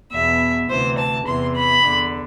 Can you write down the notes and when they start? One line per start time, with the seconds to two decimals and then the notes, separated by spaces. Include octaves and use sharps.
0.13 E2 B2 E5
0.69 D2 C3 E3 C5
0.98 A5
1.26 E2 C3 E3 C6
1.55 B5
1.83 E2 D3